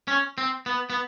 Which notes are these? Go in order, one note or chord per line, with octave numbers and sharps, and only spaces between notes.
C#4
C4
B3
B3